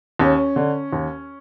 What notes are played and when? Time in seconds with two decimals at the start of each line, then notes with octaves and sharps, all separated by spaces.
0.19 D#2 C#4
0.56 D3
0.93 D#2